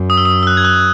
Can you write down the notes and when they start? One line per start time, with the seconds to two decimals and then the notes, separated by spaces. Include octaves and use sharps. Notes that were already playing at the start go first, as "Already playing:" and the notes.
Already playing: F#2
0.10 D#6
0.17 E6
0.25 D#6
0.43 E6
0.47 F#6
0.57 G#6
0.65 F#6